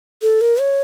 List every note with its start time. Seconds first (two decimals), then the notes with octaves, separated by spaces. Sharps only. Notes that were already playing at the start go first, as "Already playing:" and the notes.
0.22 A4
0.41 A#4
0.60 C#5